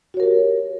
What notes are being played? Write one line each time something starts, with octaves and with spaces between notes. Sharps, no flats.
F#4 G4 A#4 C#5